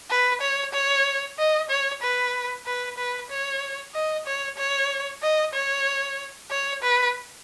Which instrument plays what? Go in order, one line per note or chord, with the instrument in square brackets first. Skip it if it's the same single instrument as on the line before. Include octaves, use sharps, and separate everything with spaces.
[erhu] B4
C#5
C#5
D#5
C#5
B4
B4
B4
C#5
D#5
C#5
C#5
D#5
C#5
C#5
B4